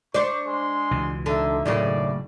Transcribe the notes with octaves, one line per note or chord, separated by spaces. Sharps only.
D4 C5 D5 C#6
G#3 C6
C#2 B2 E3
D3 D4 D#4 E5
F#1 D#2 A2 C#3 D5